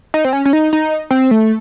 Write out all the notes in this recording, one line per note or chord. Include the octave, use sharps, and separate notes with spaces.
D#4
C4
C#4
C#4
D#4
D#4
C4
A3